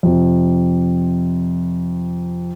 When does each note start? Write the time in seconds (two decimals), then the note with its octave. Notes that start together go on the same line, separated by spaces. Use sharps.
0.03 F2 C3